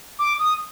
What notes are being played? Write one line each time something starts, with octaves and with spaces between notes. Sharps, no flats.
D6
D#6